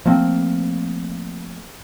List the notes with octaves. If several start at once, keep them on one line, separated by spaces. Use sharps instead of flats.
F3 A3 A#3 C4